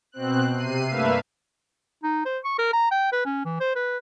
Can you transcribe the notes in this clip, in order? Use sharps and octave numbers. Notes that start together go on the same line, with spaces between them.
B2 C4 F#6
C3 C7 D#7
G2 A3 A#3 B4 E5 F5
D#4
C5
C#6
A#4
A#5
G5
B4
C#4
E3
C5
B4